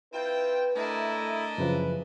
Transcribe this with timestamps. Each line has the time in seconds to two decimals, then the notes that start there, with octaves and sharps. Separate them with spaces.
0.13 C4 E4 F4 B4 G5
0.76 A3 D4 E4 A#4 D#5
1.58 F#2 C#3 E3 F3 B4